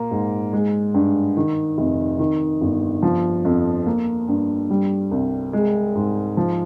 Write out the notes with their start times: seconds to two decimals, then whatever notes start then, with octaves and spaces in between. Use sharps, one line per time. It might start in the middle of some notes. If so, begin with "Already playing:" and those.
Already playing: A#2 A#3
0.11 G#2
0.53 G#3
0.94 G2
1.37 D#3
1.78 F1
2.19 D#3
2.61 G1
3.03 F3
3.45 F2
3.87 A#3
4.28 G2
4.70 G3
5.11 C2
5.53 G#3
5.95 G#2
6.37 F3